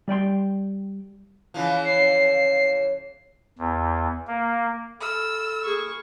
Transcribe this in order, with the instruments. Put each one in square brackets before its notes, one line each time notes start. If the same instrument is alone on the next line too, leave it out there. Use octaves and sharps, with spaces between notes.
[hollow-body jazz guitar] G3 D5 G5 C6
[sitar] C#3 E3 F3
[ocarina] C#5 [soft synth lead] C7
[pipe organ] E2
A#3
[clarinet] A4 [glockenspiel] B5 F6 [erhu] E6
[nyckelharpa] G#4 C#6